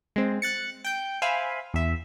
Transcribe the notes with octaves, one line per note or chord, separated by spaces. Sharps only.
G#3 C4
F#6 A6 C#7
G5 G6
C5 E5 F5 G#5 B5
E2 E5